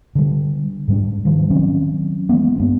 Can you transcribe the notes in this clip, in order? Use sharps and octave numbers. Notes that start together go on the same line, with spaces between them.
D3 G3
G#2 G3 D4
D#3 F3 G3
D#3 F#3 C4 C#4
E3 G#3 A#3 B3
G2 B3 C4